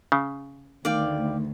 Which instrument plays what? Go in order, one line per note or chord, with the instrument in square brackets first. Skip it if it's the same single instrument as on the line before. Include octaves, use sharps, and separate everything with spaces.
[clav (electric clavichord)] C#3
[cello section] D2 [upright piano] D#3 [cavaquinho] D5 F5 G5